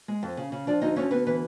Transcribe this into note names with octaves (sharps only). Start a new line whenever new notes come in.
G#3
F2
C#3
C#3
F3 D4 D5
D2 D#4 D#5
D2 C#4 C#5
D2 B3 B4
E3 B3 B4